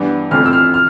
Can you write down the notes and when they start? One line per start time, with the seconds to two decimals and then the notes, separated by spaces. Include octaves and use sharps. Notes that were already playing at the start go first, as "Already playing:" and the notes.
Already playing: G2 E3 B3 D4
0.31 F2 E3 A3 C4 F6
0.46 E6
0.53 F6
0.74 F6